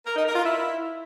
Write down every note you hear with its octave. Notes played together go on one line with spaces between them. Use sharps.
A#4
D#4
A#4
F4
E4